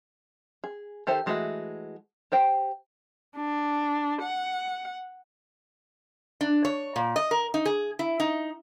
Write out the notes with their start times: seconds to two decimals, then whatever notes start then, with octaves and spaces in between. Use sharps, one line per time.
0.64 G#4
1.07 D#3 G4 A4 C5 E5
1.26 E3 G#3 A3 F#4 E5
2.32 G4 C5 G5
3.37 D4
4.22 F#5
6.41 D4
6.65 C#5
6.96 A#2
7.16 D#5
7.31 A#4
7.54 D#4
7.65 G#4
7.99 E4
8.20 D#4